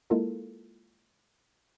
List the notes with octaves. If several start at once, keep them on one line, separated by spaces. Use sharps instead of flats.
G#3 A#3 E4 F4 A4 A#4